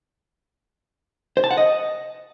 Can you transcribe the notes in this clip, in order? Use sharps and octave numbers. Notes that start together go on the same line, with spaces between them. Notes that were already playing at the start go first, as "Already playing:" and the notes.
C5
A5
F#5
D#5